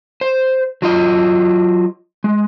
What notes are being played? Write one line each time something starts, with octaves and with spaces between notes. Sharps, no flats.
C5
F#3 F4 D#5
G#3